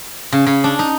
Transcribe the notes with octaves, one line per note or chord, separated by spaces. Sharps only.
C#3
C#3
D4
D#4